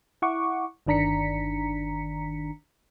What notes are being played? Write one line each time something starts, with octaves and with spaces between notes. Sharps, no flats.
E4 F#5 C#6 D6
G1 D#3 D4 A#5 B6 C#7